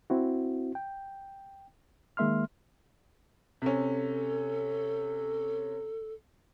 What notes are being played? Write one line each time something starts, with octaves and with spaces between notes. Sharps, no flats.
C4 E4 F#4
G5
D#3 G#3 A#3 E5 C6 F6
C3 C#4 A4